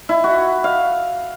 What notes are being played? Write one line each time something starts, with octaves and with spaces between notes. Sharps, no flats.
E4
F#4
F5